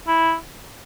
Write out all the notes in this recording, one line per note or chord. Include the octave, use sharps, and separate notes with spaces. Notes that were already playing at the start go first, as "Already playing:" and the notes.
E4